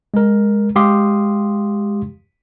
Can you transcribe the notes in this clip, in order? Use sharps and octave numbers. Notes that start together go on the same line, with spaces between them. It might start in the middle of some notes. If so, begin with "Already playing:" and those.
G#3 A#4
G#3 G4 F5 C6 D#6